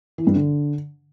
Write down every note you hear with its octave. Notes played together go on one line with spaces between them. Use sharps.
E3
G2
D3